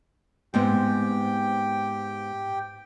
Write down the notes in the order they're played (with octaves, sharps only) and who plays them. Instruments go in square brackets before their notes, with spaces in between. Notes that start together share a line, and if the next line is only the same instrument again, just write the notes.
[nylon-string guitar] G#2 B3 C4 [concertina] G4 G5